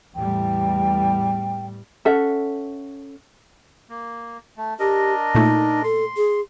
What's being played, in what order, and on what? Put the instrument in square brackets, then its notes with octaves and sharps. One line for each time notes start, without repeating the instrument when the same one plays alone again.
[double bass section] E2 A2 G3 [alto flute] G5
[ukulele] C#4 A4 E5 F#5
[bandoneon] A#3
A3
[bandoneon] D4 A#4 D#5 [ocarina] G4
[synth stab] A#2 A3 [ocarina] D#4
[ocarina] A4 [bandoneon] C6
[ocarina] G#4